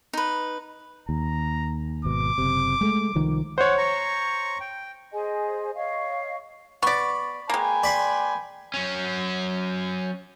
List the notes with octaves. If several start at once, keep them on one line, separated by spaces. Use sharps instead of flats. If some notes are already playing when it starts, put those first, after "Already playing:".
D#4 B4
D#2 A#5
G#1 B2 D6
F#1 C3
G#3 A3
C2 D#3 F3
C5 C#5 F#5
A#5 C#6
G5
G#4 C5 D#5 G#5
C#5 D#5 F5 C#6
B3 D5 B5 C#6
G#3 A#3 B4 G5 G#5
D5 B5 C6
F#3 C#4